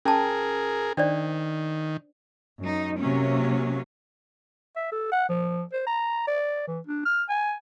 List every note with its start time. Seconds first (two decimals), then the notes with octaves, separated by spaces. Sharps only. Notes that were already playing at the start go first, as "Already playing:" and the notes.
0.05 C#4 G#4 A#4 A5
0.97 D#3 D4 C5 D5
2.61 F#2 D#4
2.98 C3 F#3 A#3 C#4
4.76 E5
4.92 A4
5.12 F#5
5.29 F3
5.73 C5
5.86 A#5
6.27 D5
6.67 E3
6.87 D4
7.05 F6
7.29 G#5